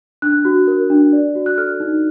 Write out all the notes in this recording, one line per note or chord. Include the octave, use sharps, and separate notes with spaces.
D4 F#6
F#4
A#4
D4
D5
F#4
F#6
A4 F6
D#4